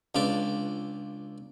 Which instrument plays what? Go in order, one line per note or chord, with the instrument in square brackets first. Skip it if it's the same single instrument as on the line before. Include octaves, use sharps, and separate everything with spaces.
[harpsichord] C#2 D4 F4 B4 D5